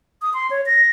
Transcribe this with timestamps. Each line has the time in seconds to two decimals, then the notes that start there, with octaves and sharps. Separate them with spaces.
0.22 D#6
0.34 C6
0.50 C#5
0.66 A#6